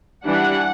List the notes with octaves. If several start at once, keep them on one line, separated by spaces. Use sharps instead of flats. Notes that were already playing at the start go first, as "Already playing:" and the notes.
E3 G3 D4 F#5